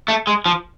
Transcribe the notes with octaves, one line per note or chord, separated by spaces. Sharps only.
A3
G#3
F3